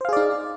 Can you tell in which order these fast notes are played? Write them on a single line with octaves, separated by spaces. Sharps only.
C5 F5 G#4 D5 D#4